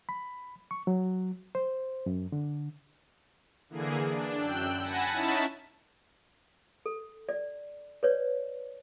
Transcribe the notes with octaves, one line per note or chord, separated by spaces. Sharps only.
B5
C#6
F#3
C5
F#2
D3
D3 E3 A#3 G#4
D4
F#2 G5 E6 F#6
F#5 G#5 A5 B5 A#6
C#4 D#4 E4 E5 A5 B5
A4
D5
B4 C#5 D5